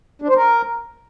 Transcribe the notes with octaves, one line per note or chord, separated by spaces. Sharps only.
D4
C5
A#4